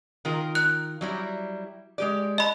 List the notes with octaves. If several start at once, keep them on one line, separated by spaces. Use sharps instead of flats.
D#3 F4 A#4
F#6
F#3 G3 E4
G#3 G4 D5
D#5 B5